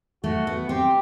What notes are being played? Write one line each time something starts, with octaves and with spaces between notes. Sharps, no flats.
A3 F#4
B3
C4 G4